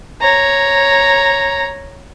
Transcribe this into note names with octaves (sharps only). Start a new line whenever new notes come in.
C#5 A#5